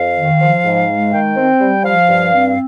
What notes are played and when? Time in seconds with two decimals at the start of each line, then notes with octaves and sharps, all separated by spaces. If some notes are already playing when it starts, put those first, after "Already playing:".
Already playing: F2 F5
0.17 D#3
0.41 F3
0.65 G#2
0.88 G#3
1.12 D#3 G5
1.37 C4
1.60 G3
1.84 F3 F5
2.08 G2
2.32 C4